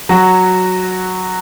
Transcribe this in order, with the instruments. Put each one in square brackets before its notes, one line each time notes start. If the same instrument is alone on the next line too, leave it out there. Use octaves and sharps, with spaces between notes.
[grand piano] F#3 F#4